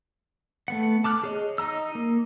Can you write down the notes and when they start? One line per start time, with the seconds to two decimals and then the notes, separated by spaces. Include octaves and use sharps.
0.68 A3 B3 F#5
1.04 A5 D6 F6 F#6
1.24 G#4 C#5 D#5
1.58 D#4 D#5 A#5 E6
1.95 A#3